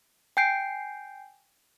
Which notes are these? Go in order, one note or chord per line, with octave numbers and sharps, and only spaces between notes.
G5 G#5 G6 C7 D7